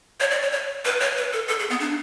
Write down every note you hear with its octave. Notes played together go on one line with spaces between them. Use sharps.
C#5
D5
C#5
C#5
B4
C#5
B4
A4
A4
G#4
B3
D4